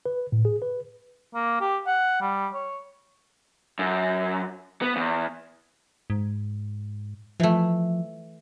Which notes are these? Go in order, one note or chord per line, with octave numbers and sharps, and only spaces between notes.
B4
A2
G#4
B4
A#3
G4
F#5
G3
C#5
F#2
B3
E2
G#2
E3 F3 A3